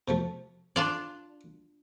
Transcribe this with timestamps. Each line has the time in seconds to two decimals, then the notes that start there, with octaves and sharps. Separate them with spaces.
0.08 C3 F3 A3
0.76 D4 F4 D5